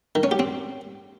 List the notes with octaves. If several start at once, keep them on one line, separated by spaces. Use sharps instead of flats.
D#3
C#4
G4
C4